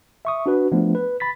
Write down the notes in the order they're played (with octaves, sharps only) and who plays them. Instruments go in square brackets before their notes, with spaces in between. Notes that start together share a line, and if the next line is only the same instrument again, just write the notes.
[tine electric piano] E5 C#6 D#6
D4 F#4 B4
F3 A3 B3 D4
B4
B5 A6 B6